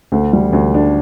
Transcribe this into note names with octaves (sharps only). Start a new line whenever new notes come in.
D2
G3
D2
D4